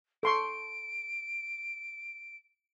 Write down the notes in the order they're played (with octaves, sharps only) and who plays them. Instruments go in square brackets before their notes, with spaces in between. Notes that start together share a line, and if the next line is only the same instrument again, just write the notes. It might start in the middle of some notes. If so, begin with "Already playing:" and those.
[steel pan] A4 C6 C#6 [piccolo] D7